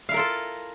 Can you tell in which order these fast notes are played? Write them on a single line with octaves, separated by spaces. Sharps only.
F5 E4 A#4 F4 A4